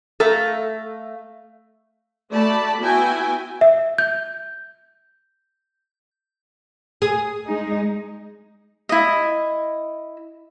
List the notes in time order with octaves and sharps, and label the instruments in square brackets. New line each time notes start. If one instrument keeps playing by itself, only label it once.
[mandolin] A3 F5 A#5 [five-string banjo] A4
[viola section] A3 F#4 D5 A5 B5
B3 E4 F#4 G5 G#5
[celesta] E5
G6
[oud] G#4
[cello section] G#3 D#4
[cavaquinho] E4 D#5